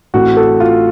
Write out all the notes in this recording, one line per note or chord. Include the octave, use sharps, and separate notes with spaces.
A1 A2 A3 C4 F#4
A4
F4